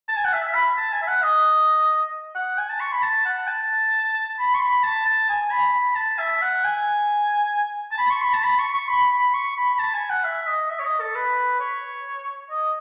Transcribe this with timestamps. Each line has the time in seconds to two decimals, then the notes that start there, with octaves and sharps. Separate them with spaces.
0.08 A5
0.17 G#5
0.25 F#5
0.33 E5
0.44 E5
0.54 B5
0.77 A5
0.92 G#5
1.02 E5
1.07 F#5
1.22 D#5
2.35 F#5
2.58 G#5
2.70 A5
2.80 C#6
2.92 B5
3.03 A5
3.25 F#5
3.48 A5
4.38 B5
4.54 C#6
4.60 B5
4.83 A5
5.06 A5
5.29 G#5
5.50 B5
5.73 B5
5.95 A5
6.19 E5
6.42 F#5
6.64 G#5
7.92 A5
7.98 B5
8.10 C#6
8.22 B5
8.33 A5
8.44 B5
8.58 C#6
8.74 C#6
8.89 B5
9.11 B5
9.34 C#6
9.57 B5
9.74 B5
9.79 A5
9.94 G#5
10.10 F#5
10.24 E5
10.47 D#5
10.70 E5
10.79 C#5
10.85 D#5
11.00 A4
11.15 B4
11.60 C#5
12.50 D#5